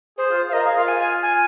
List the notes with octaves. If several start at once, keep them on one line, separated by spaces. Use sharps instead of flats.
G#4 C5
F4
F5
A#4 D#5
G#4 F5
F4 F5
G#5
G#5
G#5